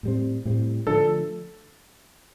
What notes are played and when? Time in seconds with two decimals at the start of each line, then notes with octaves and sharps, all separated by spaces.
0.03 A2 G3 C4
0.45 A2 G3 C4
0.87 D3 F3 A3 D4 A4